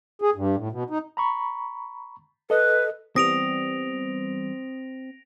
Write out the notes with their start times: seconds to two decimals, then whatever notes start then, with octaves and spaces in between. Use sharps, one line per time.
0.22 G#4
0.35 G2
0.56 A2
0.72 B2
0.90 D#4
1.17 A#5 B5 C#6
2.50 A4 B4 D#5
3.16 E3 G3 B3 C4 D#6 A#6 D7 F7